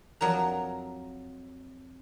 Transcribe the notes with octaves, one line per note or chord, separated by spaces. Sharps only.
F2 F#3 A#4 A#5